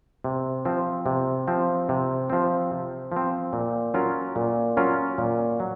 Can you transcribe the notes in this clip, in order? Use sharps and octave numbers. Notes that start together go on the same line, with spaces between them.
C3
F3 C4
C3
F3 C4
C3
F3 C4
C3
F3 C4
A#2
F#3 C#4 F4 A#4
A#2
F#3 C#4 F4 A#4
A#2
F#3